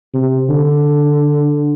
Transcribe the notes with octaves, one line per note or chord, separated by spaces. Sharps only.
C3
D3